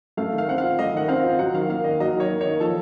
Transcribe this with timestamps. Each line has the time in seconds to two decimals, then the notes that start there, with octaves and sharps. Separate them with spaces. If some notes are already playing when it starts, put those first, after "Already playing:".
0.17 A3 F5
0.32 D#3
0.38 F5
0.48 C4 F#5
0.58 F5
0.63 F4
0.79 A3 D#5
0.93 D#3 F#5
1.08 C4 F5
1.24 F4
1.39 F#3 F#5
1.54 D#3 F5
1.69 A#3 F5
1.84 D#3 D#5
2.00 F#3 D#5
2.15 D#3
2.20 C#5
2.31 A#3
2.41 D#3 C#5
2.60 F3 A4